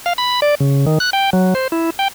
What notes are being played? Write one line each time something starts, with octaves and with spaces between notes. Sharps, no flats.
F5
B5
D5
C#3
D#3
F#6
G5
F#3
C5
E4
G5